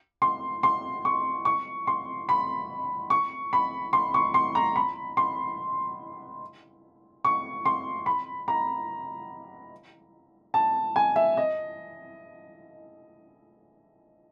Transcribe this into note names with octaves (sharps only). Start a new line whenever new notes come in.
C6
C6
C#6
C#6
C6
B5
C#6
B5
C6
C#6
C6
A#5
B5
C6
C#6
C6
B5
A#5
A5
G#5
E5
D#5